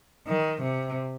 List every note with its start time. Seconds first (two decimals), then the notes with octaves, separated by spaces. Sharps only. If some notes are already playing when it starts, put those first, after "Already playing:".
0.27 D#3
0.62 C3